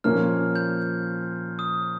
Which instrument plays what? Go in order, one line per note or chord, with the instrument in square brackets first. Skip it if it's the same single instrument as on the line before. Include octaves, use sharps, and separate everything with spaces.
[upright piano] A#2 F3 A#3 C#4 [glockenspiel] F6
[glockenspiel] G6
D#6